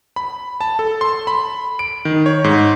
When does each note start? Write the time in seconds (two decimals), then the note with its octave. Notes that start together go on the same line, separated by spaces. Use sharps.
0.16 B5
0.61 A5
0.79 A4
1.01 C6
1.27 B5
1.79 D7
2.05 D#3
2.26 C#5
2.44 G#2